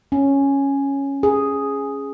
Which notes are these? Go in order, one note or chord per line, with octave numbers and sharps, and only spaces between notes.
C#4
G#4